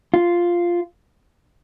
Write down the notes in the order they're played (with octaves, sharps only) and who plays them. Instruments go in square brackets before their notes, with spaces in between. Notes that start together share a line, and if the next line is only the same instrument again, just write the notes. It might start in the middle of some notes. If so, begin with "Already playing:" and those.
[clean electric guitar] F4